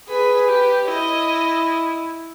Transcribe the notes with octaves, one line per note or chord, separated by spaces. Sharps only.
G#4 B4
G4 B4
E4 D#5